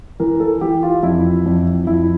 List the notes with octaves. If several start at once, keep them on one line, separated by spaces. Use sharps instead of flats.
E3 A#4
A4
E3 G4
F4
F2 E4
F2
F2 E4